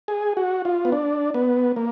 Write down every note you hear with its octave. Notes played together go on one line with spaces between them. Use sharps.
G#4
F#4
F4
B3
D4
B3
A#3